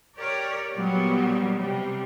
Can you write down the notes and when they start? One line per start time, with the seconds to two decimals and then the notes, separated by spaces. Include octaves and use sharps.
0.17 G4 A#4 C#5 D5
0.75 A#2 F#3 G3 B3
1.55 C3 G3